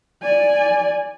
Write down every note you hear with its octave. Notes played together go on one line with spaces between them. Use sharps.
D5 G#5